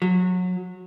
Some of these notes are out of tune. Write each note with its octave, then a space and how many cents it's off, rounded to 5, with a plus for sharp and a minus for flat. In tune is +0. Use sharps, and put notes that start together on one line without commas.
F#3 -25